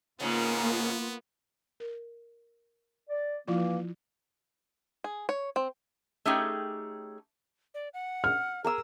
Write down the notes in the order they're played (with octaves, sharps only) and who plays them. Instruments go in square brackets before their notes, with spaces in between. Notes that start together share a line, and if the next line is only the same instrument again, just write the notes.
[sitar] G#2 C#3 [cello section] A#3 F4 [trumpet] B3
[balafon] A#4
[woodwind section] D5
[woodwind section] E3 A#3 [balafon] F3 E4 F4
[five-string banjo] G#4
C#5
C4
[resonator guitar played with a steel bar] A3 C#4 D#4 G4 G#4 G5
[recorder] D5
F#5
[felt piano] F6
[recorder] G#4 [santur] A#4 A#5 E6